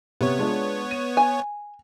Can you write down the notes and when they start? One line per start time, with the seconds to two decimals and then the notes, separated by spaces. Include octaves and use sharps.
0.21 C3 B3 C#5
0.38 G#3 D4 F4
0.91 D#7
1.17 G#5